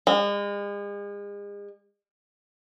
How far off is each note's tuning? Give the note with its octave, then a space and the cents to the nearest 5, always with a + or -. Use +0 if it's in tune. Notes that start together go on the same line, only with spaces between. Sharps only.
G#3 -40